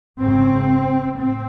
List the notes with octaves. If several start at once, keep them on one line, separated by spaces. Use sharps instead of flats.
G#1 F#2 C#3 C4
A2 C4